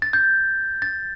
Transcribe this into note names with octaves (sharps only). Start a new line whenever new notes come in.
A6
G6
A6